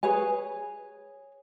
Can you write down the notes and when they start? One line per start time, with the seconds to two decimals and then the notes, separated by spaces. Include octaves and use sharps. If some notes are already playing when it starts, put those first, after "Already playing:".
0.03 G#4 B4 C#5 G#5